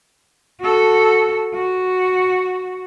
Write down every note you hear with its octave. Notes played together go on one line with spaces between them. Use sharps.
F#4 A4
F#4